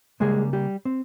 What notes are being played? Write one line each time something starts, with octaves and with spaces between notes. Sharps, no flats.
C#3 G3 G#3 A#3 G#4
G3 G4
C4